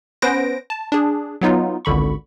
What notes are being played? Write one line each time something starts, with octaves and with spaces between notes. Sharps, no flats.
B3 C#4 B4 C5 A#6 D7
A5
D4 G#4
F#3 B3 D#4 F4
G#1 C#2 D3 B5 C#6